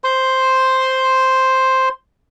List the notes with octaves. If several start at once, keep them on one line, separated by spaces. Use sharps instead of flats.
C5 C6